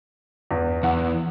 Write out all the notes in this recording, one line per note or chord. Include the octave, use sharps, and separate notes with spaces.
E2
E2 F#5